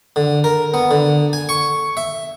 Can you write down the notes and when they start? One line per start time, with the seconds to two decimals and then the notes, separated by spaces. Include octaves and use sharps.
0.16 D3
0.44 A#4
0.74 B3
0.91 D3
1.33 G#5
1.49 C#6
1.97 E5